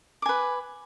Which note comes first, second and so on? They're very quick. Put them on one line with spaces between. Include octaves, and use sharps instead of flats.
D6 G#5 B4